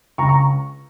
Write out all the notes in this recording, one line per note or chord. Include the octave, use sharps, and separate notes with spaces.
C#2 A#5 C#6
A#5 C#6